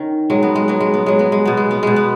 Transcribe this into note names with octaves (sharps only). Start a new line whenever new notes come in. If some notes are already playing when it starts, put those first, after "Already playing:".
Already playing: D#3 C#4
F#3 G#3
B3
G#3
F#3 B3
G#3
B3
F#3 G#3
B3
G#3
B2 B3
G#3
B3
B2 G#3
B3